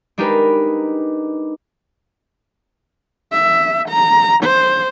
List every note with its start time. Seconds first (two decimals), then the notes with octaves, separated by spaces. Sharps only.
0.18 G#3 D4 D#4 G4 A#4 B4
3.32 E5
3.89 A#5
4.44 C5